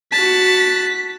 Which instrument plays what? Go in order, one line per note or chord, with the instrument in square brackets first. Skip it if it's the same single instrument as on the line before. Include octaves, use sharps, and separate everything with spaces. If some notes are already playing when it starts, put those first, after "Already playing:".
[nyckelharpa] F#4 A5 [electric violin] B6